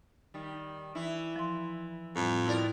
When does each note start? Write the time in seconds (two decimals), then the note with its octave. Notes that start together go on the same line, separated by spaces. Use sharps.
0.34 D#3 G3
0.95 E3 E4
1.36 F3 C6
2.16 F2 A2 G3
2.46 B2 E4 A#4 D5